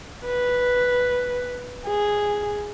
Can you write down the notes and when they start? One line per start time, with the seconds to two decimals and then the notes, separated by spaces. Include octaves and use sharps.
0.25 B4
1.87 G#4